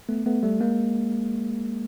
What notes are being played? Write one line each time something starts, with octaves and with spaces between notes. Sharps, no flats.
A3 B3
A3 B3
G3 A3
G#3 A#3